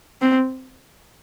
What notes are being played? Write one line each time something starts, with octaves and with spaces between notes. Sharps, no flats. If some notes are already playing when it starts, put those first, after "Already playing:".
C4